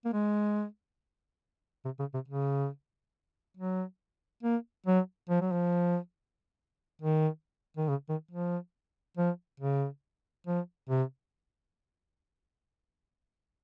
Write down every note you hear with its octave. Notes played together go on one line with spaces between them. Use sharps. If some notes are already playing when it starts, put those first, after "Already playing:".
A#3
G#3
C3
C#3
C3
C#3
F#3
A#3
F#3
F3
F#3
F3
D#3
D#3
C#3
D#3
F3
F3
C#3
F3
C3